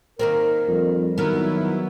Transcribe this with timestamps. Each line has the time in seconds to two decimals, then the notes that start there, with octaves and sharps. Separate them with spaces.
0.19 D#3 A#3 C4 A#4
0.68 F2 G3
1.18 D#3 F#3 B3 E4 A#4